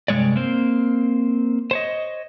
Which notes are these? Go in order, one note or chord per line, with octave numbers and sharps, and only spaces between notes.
G2 C3 E3 G#3 C#5 D5
A#3 C4 C5
C5 C#5 D#5